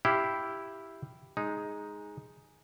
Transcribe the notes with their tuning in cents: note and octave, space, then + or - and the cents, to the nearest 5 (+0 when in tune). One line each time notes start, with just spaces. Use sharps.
E4 +0 G4 +0 F5 +0
G#3 +0 D#4 +5